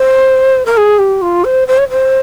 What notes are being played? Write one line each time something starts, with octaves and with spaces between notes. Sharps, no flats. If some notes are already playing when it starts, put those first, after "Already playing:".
Already playing: C5
A#4
G#4
G4
F4
C5
C5
C#5
C5